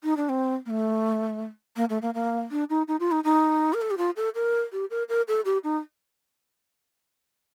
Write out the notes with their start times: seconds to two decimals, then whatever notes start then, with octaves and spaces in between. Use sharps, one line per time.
0.04 D#4
0.17 D4
0.29 C4
0.66 A#3
0.70 A3
1.76 A#3
1.90 A3
2.02 A#3
2.14 A#3
2.51 D4
2.70 D#4
2.88 D#4
3.00 F4
3.11 D#4
3.24 D#4
3.74 A#4
3.82 A4
3.91 G4
3.98 F4
4.16 A4
4.35 A#4
4.72 G4
4.90 A#4
5.09 A#4
5.28 A4
5.45 G4
5.64 D#4